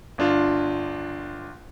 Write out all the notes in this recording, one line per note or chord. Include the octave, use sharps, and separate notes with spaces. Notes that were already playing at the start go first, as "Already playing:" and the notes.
G1 D4 F4